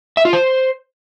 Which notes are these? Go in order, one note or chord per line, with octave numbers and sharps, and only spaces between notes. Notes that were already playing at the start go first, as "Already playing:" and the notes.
E5
F4
C5